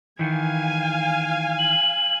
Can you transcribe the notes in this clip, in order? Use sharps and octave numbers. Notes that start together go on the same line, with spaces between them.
D#3 E3 F5 G#5
F#7